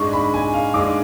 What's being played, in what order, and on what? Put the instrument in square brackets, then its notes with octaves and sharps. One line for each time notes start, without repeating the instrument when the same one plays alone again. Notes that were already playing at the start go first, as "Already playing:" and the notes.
Already playing: [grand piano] G#2 G#3 D4 C#6
B5
G#5
F5
G#2 G#3 D4 D6